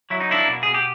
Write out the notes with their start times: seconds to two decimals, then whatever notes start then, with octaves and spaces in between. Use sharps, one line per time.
0.10 F#3 E4
0.20 D#4
0.29 A#3 D4 E4
0.47 B2
0.63 B2 G#4
0.74 G4